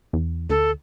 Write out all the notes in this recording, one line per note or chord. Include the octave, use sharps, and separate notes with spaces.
E2
D2 A4